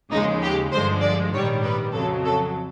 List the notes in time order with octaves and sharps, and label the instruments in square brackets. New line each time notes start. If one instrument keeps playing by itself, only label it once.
[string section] D#2 C#3 F3 G#3 D#4
G4
G2 D3 F3 G#3 C5
D5
A#1 G#2 D#3 G3 C#5
B4
F2 C#3 F#3 A4
A4